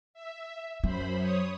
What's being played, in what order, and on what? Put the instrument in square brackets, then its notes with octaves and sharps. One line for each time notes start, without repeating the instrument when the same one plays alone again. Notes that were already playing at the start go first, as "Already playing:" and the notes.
[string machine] E5
[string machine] F#2 C5 B5 [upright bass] F#3
[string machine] C#5 D#6